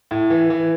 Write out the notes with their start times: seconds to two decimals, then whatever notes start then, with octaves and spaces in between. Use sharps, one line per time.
0.11 A2
0.30 E3
0.50 E3